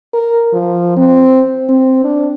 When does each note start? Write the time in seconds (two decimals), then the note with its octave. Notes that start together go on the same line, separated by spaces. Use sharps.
0.14 A#4
0.53 F3
0.97 C4
1.69 C4
2.04 D4